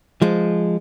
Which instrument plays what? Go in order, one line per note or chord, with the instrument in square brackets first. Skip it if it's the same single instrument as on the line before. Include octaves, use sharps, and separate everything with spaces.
[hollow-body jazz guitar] F3 G#3